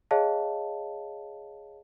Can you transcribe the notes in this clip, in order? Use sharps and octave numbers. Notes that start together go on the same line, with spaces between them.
G#4 C#5 D#5 F5 A5